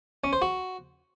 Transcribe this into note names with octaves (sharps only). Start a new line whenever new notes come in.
C#4
C5
F#4